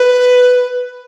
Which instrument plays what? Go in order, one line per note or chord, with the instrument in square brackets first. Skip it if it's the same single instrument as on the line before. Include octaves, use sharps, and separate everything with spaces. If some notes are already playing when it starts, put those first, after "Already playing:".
Already playing: [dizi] B4